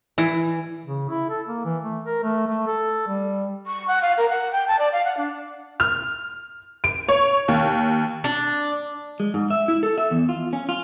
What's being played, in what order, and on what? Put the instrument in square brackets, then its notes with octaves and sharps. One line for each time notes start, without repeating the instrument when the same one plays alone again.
[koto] E3
[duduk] C#3
E4
A4
A#3
E3
A3
A#4
A3
A3
A4
G3
[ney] C#6
F#5
F5
A#4
F#5
G5
A5
D5
F5
F#5
D4
[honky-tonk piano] F6
D7
C#5
D#2
[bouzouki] D4
[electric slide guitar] G#3
G#2
E5
E4
A4
E5
E2
F4
C#4
F4